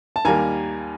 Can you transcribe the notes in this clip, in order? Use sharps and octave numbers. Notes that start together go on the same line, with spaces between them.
A5
D#2 D#3 G3 A#3 G#5 A#5